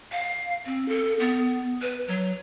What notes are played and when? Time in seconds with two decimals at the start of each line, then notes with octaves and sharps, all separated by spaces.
0.12 F5
0.66 C4
0.89 A4
1.20 B3
1.81 B4
2.08 F#3